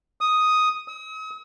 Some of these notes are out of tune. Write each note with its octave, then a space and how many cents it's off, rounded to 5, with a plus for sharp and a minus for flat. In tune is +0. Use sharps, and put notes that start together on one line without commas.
D#6 +5
D#6 +45